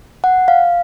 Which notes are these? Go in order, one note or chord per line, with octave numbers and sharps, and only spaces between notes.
F#5
F5